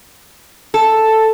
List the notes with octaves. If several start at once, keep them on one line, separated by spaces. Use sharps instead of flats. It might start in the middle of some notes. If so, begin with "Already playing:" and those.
A4